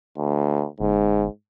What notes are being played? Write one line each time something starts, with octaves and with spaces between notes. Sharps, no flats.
D2
G1 G#2